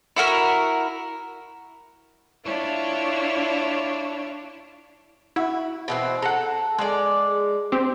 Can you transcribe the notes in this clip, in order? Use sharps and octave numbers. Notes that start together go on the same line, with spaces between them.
E4 F#4 A#4
D4 E4 F4 C#5 C#6
E4 F#4
B2 E3 C4
A4 F#5 A#5
G#3 D5
C4 G4